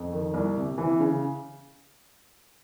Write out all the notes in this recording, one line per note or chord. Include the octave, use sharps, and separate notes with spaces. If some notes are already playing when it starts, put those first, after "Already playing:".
Already playing: F2
D#3
C2
C3
E3
C#3